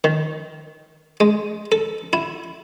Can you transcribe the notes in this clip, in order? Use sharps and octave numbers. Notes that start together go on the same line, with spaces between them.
D#3
G#3
A4
E4